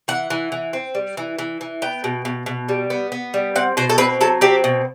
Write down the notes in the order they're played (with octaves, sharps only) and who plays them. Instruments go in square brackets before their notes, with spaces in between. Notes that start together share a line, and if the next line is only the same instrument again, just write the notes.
[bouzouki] E3 F#5
E3
E3
C4
G3
E3
E3
E3
B3 G5
B2
B2
B2
G3
B3
B3
G3
C4 F#5
B2 C5
A4
C4 B4
F#3 A4
C4 G4
B2